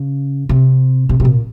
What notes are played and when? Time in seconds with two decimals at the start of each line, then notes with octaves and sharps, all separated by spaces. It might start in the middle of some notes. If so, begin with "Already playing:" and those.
Already playing: C#3
0.49 C3
1.09 C3
1.20 C3
1.25 A#2